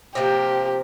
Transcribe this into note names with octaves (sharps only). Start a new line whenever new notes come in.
C3 F3 A#3 G4